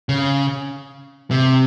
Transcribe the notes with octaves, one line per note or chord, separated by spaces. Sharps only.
C#3
C3